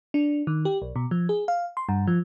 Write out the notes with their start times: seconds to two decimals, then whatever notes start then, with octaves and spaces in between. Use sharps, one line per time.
0.14 D4
0.47 D#3
0.65 G4
0.82 B1
0.96 B2
1.11 F3
1.29 G#4
1.48 F5
1.77 C6
1.89 G2
2.07 F3